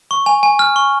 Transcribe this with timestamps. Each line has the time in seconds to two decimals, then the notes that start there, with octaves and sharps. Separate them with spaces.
0.11 C#6
0.26 G#5
0.43 G#5
0.59 F6
0.76 C#6